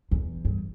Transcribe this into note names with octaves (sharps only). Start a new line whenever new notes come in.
E2
G2